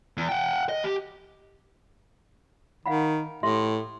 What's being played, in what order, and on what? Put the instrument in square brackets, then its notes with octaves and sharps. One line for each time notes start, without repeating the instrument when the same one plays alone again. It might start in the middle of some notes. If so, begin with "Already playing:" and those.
[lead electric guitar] E2
F#5 G5
D#5
G4
[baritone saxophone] D#3 [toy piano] F5 F#5 B5
[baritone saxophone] A2 [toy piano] G4 E5 C6